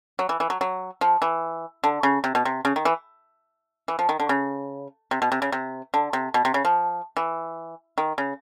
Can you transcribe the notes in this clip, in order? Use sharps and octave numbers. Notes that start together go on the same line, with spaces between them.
F#3
E3
E3
F#3
F#3
F3
E3
D3
C#3
C3
B2
C3
C#3
D#3
E3
E3
F3
D#3
D3
C#3
C3
B2
C3
C#3
C3
D3
C3
B2
C3
C#3
F3
E3
D#3
C#3